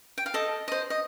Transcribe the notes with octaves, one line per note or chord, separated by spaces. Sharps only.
G5
F5
A4 D#5
C5 D#5
D#5